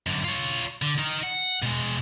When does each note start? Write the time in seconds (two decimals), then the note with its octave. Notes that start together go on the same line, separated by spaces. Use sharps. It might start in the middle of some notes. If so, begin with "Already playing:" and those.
0.07 F#2 D3
0.25 F4 C#5
0.82 D3
0.98 D#4 A#4
1.23 F#5
1.62 B2 G#3